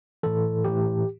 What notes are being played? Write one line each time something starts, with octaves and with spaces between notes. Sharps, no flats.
A2 E3 A4
A2 E3 G4